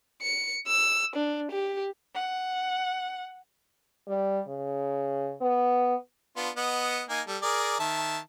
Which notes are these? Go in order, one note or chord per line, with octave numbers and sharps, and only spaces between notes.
C#7
E6
D4
G4
F#5
G3
C#3
B3
B3 D4 F4
B3 D#5 F#5
A#3 D#4 G#5
G3 A4
G#4 A#4 D5
D#3 E5 A5